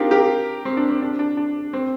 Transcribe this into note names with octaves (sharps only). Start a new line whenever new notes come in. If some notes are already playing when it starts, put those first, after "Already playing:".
Already playing: C4 D4 D#4 F4 G4 A#4
G4 A#4
C4
D4
C4
D4
D4
D4
C4